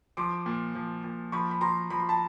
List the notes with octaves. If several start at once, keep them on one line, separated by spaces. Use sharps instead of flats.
F3 C6 D6
A#2
F3
A#2
F3 B5 C#6
B5
F3 A#5 C6
F3 B5
C6
A5 B5